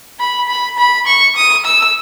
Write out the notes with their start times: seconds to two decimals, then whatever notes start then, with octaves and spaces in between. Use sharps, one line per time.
0.19 B5
0.48 B5
0.78 B5
1.07 C#6
1.36 D#6
1.65 E6